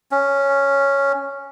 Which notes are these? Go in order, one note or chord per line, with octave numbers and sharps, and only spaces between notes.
C#4